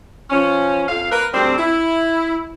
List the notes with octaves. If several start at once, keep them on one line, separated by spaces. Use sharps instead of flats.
F3 C#4
F2 F5
A#4 B4
D2 G3 C4
E4